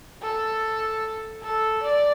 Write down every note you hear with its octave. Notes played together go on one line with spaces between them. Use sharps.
A4
A4
D5